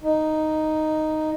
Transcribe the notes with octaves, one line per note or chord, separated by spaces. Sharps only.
D#4